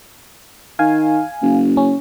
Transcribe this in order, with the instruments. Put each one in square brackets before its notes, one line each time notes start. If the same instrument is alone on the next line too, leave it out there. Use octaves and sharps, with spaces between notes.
[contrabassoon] D#3 [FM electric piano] F5 G#5
[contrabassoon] F#1
[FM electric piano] C#4